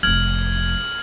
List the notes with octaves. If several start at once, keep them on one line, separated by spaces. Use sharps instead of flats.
F1 F2 F6 G#6 F#7